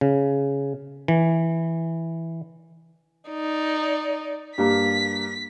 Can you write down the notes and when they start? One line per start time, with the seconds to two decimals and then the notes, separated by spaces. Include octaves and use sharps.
0.01 C#3
1.08 E3
3.30 D#4 D5
4.58 G2 A#3 B6